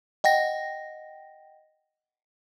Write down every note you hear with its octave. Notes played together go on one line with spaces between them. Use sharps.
D#5 F#5 G5 A#6